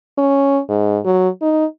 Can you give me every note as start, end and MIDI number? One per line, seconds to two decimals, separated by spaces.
0.18 0.60 61
0.69 0.99 44
1.05 1.29 54
1.42 1.65 63